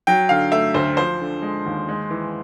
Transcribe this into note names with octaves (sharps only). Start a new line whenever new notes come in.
F#3 G5
D3 F5
A3 E5
D2 C5
F3 C5
D3
G#3
D#2
G#3
E3